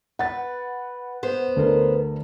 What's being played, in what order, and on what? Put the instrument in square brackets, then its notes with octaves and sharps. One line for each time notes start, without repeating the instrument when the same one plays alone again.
[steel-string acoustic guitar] B4 [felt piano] F#5 A6
[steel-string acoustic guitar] B3 C5
[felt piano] D2 A#4